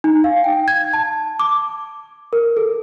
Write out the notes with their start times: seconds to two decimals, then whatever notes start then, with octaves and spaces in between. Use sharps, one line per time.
0.04 D#4
0.24 F5
0.44 G5
0.68 G#6
0.93 A5
1.40 D6
2.33 A#4
2.57 A4